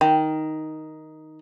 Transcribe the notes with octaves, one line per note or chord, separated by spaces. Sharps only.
D#3